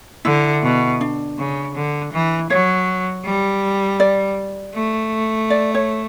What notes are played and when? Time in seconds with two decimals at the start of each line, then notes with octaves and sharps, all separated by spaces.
0.25 D3 E4
0.63 B2
1.01 D4
1.38 C#3
1.75 D3
2.13 E3
2.50 F#3 C#5
3.25 G3
4.00 D5
4.75 A3
5.50 D5
5.74 C#5